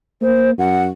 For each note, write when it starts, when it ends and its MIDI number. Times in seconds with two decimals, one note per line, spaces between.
0.21 0.58 58
0.21 0.50 72
0.58 0.89 42
0.58 0.83 78